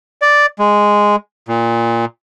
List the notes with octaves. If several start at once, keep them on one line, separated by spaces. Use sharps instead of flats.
D5
G#3
A#2